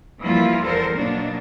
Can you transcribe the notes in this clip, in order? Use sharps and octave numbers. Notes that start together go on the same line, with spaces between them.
E3 F3 G3 A#3 E4 F4
E2 A4 A#4 C5
B2 F#3 A#3 D4 D#4